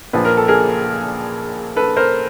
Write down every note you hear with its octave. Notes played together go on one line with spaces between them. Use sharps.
A#1 A#2 F3 B4
A#4
A4
G#4 A#4
A4 B4
A#4 C5